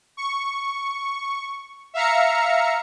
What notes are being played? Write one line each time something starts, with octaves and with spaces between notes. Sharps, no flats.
C#6
E5 F5 A#5 C#7